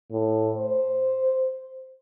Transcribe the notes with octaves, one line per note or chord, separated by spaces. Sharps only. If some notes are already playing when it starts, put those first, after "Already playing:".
A2
C5